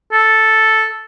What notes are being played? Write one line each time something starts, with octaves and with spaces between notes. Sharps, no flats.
A4